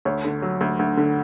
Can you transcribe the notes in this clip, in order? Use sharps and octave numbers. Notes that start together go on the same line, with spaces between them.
D2 C#5
D3
F#3
D2
D2
D3